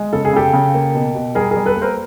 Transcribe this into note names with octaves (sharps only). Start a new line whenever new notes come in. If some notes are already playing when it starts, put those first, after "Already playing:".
Already playing: G#3
C#3 A4
G#4
C#3 G4 A4
C#3
A#3
B2
B2
G3 G#4 A#4
G#4 A#4
G3
A4 B4
A#3
A#4 C5